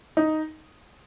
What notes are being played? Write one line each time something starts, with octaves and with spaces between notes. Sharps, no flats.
D#4